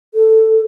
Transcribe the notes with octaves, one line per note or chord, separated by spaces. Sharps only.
A4